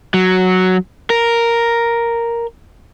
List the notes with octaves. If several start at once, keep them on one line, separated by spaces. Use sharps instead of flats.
F#3
A#4